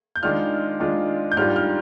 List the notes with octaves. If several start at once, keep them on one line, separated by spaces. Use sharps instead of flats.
G6
D#3 G#3 D4 F4 F6
D#3 G#3 D4 F4
G6
G#2 G3 D4 F4 F6
F6